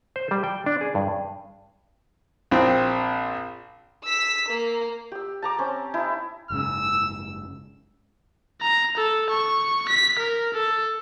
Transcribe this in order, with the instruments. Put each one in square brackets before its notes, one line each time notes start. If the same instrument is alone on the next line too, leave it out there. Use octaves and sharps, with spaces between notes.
[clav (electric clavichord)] C5
G3
G5
D4
G#4
G2
[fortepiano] A#1 C4
[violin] E6 B6
A#3
[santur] G4 E6
A5 A#5 D6
C4 C#4
D#4 E4
[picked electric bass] F#1 G#2 C#3 [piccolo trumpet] E6
[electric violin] A#5
A4
C#6
B6
A#4
A4